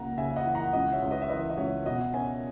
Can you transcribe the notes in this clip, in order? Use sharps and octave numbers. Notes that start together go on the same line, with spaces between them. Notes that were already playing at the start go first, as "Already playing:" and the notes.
Already playing: C#2 A#3 F#5 A#5
C#3 E5 G#5
D#5 F#5
E3
F#5 A#5
C#2 D#5 F#5
C#5 E5
C#2
B4 D#5
E5
E3 B4 D#5
D#5
C#2 C#5 E5
B2 D#5 F#5
C#4 E5 G#5